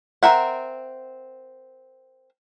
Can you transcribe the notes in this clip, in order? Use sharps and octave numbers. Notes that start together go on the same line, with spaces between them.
C4 A#4 E5 F#5